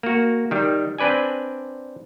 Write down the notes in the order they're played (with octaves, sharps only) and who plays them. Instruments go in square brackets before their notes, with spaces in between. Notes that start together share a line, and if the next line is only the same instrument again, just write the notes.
[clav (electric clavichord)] A#3 F#4
D#3 G3
C4 D4 B4 D5 G#5